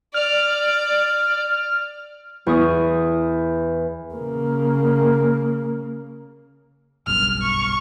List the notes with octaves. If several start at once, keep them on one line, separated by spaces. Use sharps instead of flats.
D5 F6
E2 C#6 D#6
C#3 A#3
F#1 B1 G2 F6
C#6